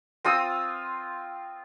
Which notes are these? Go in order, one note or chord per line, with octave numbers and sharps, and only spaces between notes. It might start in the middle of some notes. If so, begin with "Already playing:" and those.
C4 F4 D#6 E6